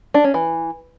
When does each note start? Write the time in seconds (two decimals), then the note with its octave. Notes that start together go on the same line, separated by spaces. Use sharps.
0.14 D4
0.24 C#4
0.34 E3